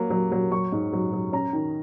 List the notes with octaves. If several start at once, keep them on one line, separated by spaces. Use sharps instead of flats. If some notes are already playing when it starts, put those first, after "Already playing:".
Already playing: F#3 A#3
F#3
F#3
F#3 C#6
G#2
F#3
F#3
C#4 A#5
D#3